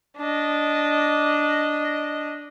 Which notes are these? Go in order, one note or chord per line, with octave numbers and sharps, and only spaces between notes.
D4 D#5